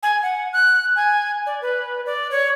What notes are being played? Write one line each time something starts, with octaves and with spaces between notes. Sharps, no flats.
G#5
F#5
F#6
G#5
D5
B4
D5
C#5